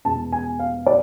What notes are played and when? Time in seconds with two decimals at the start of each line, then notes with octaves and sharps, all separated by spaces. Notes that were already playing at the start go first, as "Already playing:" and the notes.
0.05 E2 B2 G#3 A5
0.32 G#5
0.59 F5
0.86 D5